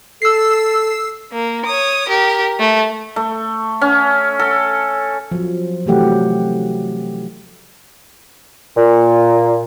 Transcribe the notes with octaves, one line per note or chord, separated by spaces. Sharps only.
A4 E6 C7
A#3
C#5 D#6
G4 A#4
A3
A3
C#4
A4
F3 F#3
C3 E3 F#3 A3 G4 F#5
A#2